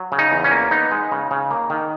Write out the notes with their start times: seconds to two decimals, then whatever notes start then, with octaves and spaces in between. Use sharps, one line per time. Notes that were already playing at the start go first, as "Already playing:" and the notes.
Already playing: F#3
0.12 C#3
0.19 D#4
0.32 E2
0.44 C#4
0.51 A#3
0.71 B3 D#4
0.91 G#3
1.12 C#3
1.31 C#3
1.51 A#3
1.70 D#3